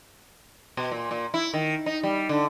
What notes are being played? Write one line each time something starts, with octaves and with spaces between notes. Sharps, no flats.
B2
A#2
A#2
E4
D#3
D#4
G3
D3